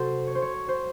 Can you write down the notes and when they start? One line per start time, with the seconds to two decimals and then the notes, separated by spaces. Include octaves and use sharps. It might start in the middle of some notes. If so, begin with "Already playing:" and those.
Already playing: C3 F#3 F#4 A4 C5
0.27 C#5
0.35 C5
0.42 C#5
0.68 C5